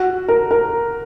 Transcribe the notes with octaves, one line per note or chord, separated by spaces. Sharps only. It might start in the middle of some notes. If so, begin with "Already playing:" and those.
Already playing: F#4
A#4
A#4